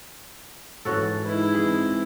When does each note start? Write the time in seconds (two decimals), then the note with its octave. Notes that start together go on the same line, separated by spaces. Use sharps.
0.85 G#2 E3 C#4 F#4 A4
1.25 G#3 D#4 E4 B4
1.55 E3 C4 G#4